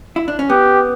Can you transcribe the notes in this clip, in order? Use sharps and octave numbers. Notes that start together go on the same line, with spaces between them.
E4
D4
C#4
B3 G4